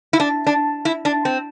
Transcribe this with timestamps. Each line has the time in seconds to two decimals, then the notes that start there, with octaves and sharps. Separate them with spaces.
0.13 E4
0.20 D4
0.47 D4
0.85 E4
1.05 D4
1.25 C4